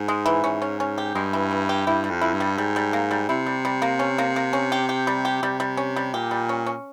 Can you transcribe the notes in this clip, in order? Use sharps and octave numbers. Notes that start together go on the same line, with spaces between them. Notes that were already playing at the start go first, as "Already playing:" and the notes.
Already playing: G#2
G#3
E3
G#2 C#4
C#4
C#4
G4
G2 G#3
E3
E3
G4
G2 E4
G3
F2
E4
G2
G3
G#2 G3
G3
A#3
G3
C3 E4
G3
G3
A#3
C#4
A#3
A#3
C#4
G4
G4
G3
G4
C3 G3
G3
C#4
G3
A#2 G4
G3
C#4
C#4